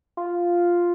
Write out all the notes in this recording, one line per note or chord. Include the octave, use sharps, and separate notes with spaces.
F4